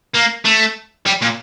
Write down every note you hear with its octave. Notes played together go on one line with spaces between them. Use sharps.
A#3
A3
G3
A#2